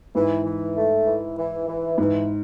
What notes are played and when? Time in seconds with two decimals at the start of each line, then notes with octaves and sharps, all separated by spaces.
0.15 G#2 E3
0.45 E3
0.75 A3
1.06 E3
1.38 E3
1.68 E3
1.98 G#2 E3